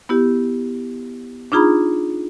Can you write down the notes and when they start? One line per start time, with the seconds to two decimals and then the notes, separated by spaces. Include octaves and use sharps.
0.09 B3 E4 G4
1.52 D4 D#4 F4 G#4 A#5 B5